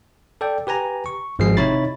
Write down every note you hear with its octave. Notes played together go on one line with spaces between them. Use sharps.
A4 D5 G5
G4 B4 G#5 A#5
C#6
G#1 F3 G#3 F#4 G#4 C7
C3 D#4 E4 C#5 B5 A6